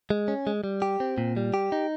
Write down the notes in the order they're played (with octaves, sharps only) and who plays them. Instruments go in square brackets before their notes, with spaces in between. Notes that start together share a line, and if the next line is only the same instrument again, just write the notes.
[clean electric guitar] G#3
C#4
G#3
G3
G4
C4
A#2
G3
G4
D#4